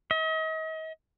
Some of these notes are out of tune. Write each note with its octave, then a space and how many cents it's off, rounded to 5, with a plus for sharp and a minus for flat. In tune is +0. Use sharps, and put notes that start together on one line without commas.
D#5 +40